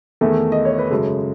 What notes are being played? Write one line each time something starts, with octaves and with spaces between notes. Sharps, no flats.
E2 D#3 A3 A4
D#5
C#5
B4
F#2 C#3 G#3 A4